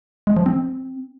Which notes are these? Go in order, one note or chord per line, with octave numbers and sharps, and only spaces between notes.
G#3
F3
C4